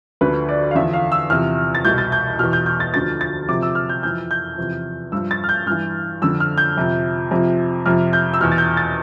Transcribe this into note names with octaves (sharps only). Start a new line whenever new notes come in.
D2 D3 F3 B4
D5
F5
E2 D3 F3 E5
F5
E6
E2 C3 F3 F6
A6
C2 B2 G6
A6
G6
E2 B2 F6
G6
G6
A6
D2 D3 F3 A6
A6
F2 C3 F3 D6
E6
F6
G6
F2 E3 G6
G6
E2 C3 F3
G2 F3 E6
A6
F6
G6
G2 E3 F6
F2 D3 F3 E6
F6
G6
F2 C3 F3
F2 C3 F3
F2 C3 F3 F6
G6
E6
E2 B2 F6
A6
G6
A6